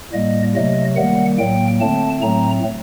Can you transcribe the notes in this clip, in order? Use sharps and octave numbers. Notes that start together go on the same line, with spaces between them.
A2 G3 A#3 D#5
C3 F#3 A3 D#5
D#3 G3 A#3 F#5
A2 F#3 A#3 G5
D3 A3 C4 A5
A2 F#3 A3 C4 A#5